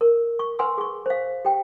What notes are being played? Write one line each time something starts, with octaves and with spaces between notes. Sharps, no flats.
A#4
C#6
B4 F#5 G#5 C6 E6
G#4 C#6
C5 F5
G4 G5